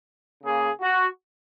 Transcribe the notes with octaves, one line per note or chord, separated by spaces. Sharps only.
C#3 A#3 G#4
F#4